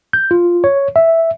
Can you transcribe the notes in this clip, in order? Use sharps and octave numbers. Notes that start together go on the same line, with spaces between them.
G6
F4
C#5
E5